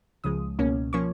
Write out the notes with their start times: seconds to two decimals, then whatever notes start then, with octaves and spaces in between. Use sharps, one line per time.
0.24 C#2 C#3 F3 G#3 D#6
0.59 C#2 B2 A#3 C#4
0.93 F3 A#3 C#4 C#6